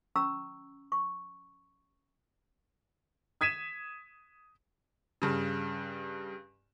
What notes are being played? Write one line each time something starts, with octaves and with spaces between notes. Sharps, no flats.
C#4 A#5 C#6 E6
C#6
D#6 G#6 B6 D#7 E7
G2 C#3